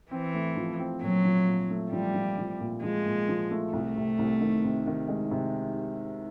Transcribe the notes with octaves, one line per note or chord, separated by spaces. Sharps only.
E3 C4
A3
F3
C4
A#2 F#3
F3
A#2
A3
F3 G3
F3
F3
A#2
F3 G#3
A#2
F3
A3
C2 A3
C3
C2
D#3
C3
D#3
G#3
C3